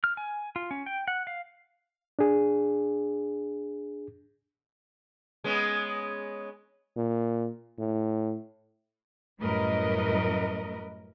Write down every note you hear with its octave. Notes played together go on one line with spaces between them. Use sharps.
F6
G#5
F4
C#4
G5
F#5
F5
D4 G#4
G#3 B3 C#4
A#2
A2
F#2 A2 G3 A#4 B4 D#5